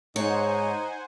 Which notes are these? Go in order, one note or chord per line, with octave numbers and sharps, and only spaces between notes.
G#2 D#4 C5 C#5 F#5 G#5